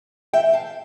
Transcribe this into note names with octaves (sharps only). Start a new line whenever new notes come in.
E3 E5 G5
F5 A5